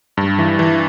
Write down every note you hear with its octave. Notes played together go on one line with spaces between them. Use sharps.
G2
E3
E3